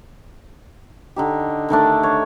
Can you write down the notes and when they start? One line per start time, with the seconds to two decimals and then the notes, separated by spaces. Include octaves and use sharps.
1.16 D3 D#4 G4
1.69 D3 D#3 A3 D4
2.03 C#5